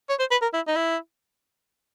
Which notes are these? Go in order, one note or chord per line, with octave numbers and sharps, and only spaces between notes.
C#5
C5
B4
A#4
E4
D#4
E4